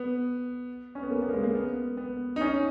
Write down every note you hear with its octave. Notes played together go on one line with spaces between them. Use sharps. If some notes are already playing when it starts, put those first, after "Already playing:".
Already playing: B3
C#4
B3
A#3
B3
A#3
G#3
A#3
B3
B3
D#4
C#4